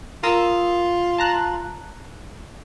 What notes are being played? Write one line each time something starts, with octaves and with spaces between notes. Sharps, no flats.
F4 A#4 D#6 E6
A5 A#5 F#6